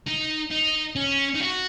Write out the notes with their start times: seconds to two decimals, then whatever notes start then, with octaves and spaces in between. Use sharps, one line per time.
0.07 D#4
0.51 D#4
0.96 C#4
1.35 D#4
1.41 F#4